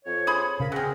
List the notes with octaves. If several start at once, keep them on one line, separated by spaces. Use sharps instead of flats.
F2 C#5
G#4 C5 B5
C#3 A#4 F5 B5
F#3 C4 G#4 A#4